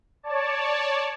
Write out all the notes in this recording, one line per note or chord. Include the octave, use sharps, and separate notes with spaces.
C#5 D5 A5